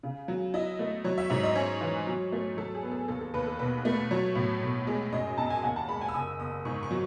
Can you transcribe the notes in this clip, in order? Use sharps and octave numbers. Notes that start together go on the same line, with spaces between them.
C#3
F#3
E4 D#5
A3
F#3 C#5
E5
G#2 E5
D#5
C#4 C#5
E3
F#3
A3
F#3 A4
G#4
B3
A4
D#2 A4
A4
D#2 B4
A4
B1 B4
A3
F#3 C#5
A2
B1
G#3
F#2 D#5
F#2 A5
G#5
D#2 F#5
A5
G#3 B5
G#5
E6
F#1 D#6
F#1 D#6
G#2 C#6
C#6
F#3